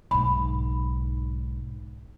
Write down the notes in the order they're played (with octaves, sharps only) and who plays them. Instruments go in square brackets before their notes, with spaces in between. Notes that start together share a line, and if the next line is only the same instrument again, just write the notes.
[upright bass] B1 G#2 [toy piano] B5